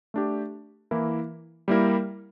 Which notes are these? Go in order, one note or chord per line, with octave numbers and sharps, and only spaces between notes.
A3 D4 G4
E3 A#3 E4 A#4
G3 A#3 E4 A#4